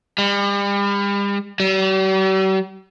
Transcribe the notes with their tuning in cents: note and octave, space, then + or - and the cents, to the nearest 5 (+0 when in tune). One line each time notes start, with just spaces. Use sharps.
G3 +40
G3 -45